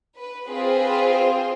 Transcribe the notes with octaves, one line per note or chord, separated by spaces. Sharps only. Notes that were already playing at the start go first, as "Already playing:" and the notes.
B4
C4 F4 G#4 B4
B4
C5